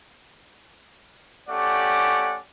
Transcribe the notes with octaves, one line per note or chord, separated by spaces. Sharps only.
A3 C#4 G4 D5 F#5